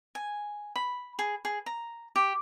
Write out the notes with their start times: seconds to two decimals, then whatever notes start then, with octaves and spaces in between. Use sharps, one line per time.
0.15 G#5
0.76 B5
1.19 G#4
1.45 G#4
1.66 A#5
2.16 G4